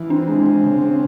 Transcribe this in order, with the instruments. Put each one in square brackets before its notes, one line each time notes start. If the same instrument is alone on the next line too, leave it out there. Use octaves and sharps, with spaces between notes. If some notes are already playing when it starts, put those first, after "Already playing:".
Already playing: [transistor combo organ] E3
[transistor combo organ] C4 [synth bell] D4
[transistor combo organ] G#3
C4
C#3
C4